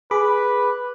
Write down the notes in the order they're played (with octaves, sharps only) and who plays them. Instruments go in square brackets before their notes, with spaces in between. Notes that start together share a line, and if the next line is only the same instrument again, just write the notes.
[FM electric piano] G#4 B5 D6 [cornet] B4